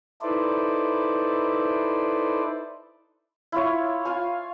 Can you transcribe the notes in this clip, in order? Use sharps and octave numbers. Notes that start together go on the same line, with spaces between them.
D#4 E4 A4 B4 C5 D5
E4 F4 C#5
F4 F5 G#5